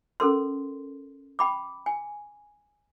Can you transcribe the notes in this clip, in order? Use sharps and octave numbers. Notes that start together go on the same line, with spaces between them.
C#4 A4 A#4 C6
G5 B5 D6
G#5